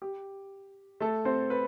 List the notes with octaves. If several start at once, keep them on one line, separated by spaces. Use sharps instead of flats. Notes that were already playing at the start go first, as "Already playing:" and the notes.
G4
A3 A4
C4 C5
B4 B5